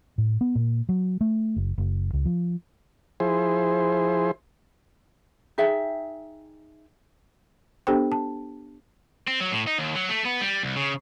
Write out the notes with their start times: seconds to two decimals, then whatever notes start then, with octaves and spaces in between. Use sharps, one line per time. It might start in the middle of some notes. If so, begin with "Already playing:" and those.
0.18 A2
0.41 B3
0.55 A#2
0.89 F#3
1.21 A3
1.56 F#1
1.78 F#1
2.13 C#2
2.25 F3
3.20 F3 E4 G#4 C5
5.58 D#4 G#4 E5 G5
7.87 B3 D4 G4 A4 C5 G5
8.12 A5
9.28 C4
9.40 F#3
9.52 A2
9.67 D#4
9.78 D#2
9.95 F#3
10.09 A3
10.25 B3
10.41 G3
10.63 C2
10.76 C#3